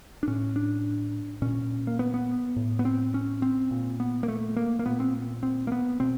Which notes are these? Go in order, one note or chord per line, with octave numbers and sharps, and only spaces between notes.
D4
A2 C#4
D4
A#2 C#4
A#3
B3
B3
A2
B3
C4
C#4
C4
A#2
B3
A#3
A3
A#3
A#3
A#2 B3
C4
C4
A#3
B3
B2 C4